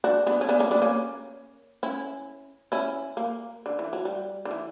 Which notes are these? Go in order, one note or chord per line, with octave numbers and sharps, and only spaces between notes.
D4 F#4
B3 D4
C#4
B3 D4
A#3 C#4
B3 D4
A#3 C#4
C#4 E4
C#4 E4
A#3
D3
E3
F#3
G3
D3
E3